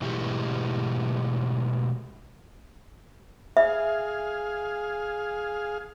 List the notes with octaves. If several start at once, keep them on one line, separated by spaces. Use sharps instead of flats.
B2 E3 G#3 A3 G4
G#4 E5 F5